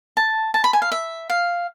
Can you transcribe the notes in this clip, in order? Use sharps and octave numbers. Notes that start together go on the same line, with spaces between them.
A5
A5
B5
G#5
F5
E5
F5